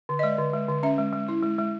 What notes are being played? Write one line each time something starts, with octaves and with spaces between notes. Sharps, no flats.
D3
D#5
G#3 D5
D3
G#3
D3
C#4 E5
G#3
G#3
E4
G#3
G#3